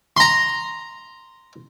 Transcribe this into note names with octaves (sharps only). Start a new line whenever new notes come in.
A#5 C6